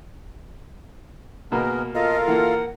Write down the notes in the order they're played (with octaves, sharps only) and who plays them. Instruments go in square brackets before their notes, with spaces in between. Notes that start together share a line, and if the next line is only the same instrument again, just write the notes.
[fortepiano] B2 A#3 [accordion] G#3 B3 A#4
[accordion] F4 A4 F5 [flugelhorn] A#4 [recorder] D#5
[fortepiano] E3 A#3 [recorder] F#5